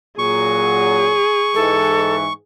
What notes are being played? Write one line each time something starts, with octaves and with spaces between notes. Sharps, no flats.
A#2 F#3 G#4 C#6
G#2 E3 A4